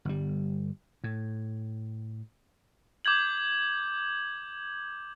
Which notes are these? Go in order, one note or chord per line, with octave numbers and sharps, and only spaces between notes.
G1 G3
A2
D6 G6 G#6 F#7